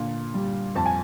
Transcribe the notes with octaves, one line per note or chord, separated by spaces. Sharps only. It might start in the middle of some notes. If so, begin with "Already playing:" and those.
Already playing: A#2 D3
G3
F2 A5
G#5